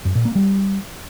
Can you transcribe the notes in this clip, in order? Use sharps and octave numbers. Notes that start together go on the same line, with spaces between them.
F#2
A#2
A#3
G3